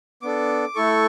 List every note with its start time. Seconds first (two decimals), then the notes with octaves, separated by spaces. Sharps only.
0.22 B3 D4 A4 D6
0.75 A3 E4 A4 C#6